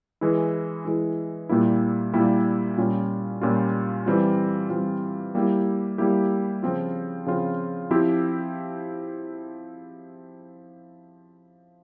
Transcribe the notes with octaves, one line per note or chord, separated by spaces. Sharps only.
E3 G#3 E4
E3 G#3 E4
A#2 G3 A#3 E4
A#2 G3 A#3 E4
A#2 G3 C#4 F4
A#2 G3 C#4 F4
E3 G3 C4 F4
E3 G3 C4 F4
G3 A#3 E4 G4
G3 A#3 E4 G4
C#3 F3 C4 F4
C#3 F3 C4 F4
F3 C4 E4 G4